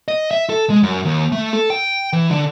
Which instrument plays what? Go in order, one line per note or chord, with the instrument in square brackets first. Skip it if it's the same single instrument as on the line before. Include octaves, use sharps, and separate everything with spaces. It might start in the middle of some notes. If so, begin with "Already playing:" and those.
[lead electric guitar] D#5
E5
A4
G#3
F#2
D#2
A3
A4
G5
E3
D3